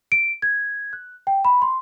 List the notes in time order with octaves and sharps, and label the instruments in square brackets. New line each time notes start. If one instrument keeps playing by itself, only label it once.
[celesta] D7
G#6
F#6
G5
B5
C6